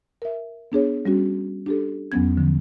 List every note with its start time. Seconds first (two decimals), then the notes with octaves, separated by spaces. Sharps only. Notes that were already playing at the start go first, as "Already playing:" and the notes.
0.22 A#4 E5
0.72 B3 D4 G#4 C#5
1.05 G3 C#4 F#4
1.66 D4 G4 A4
2.12 E2 F#3 B3 C#4 G#6
2.37 D3 F3